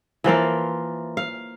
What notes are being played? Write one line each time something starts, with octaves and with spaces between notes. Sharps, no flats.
E3 F3 A#3 F4
F5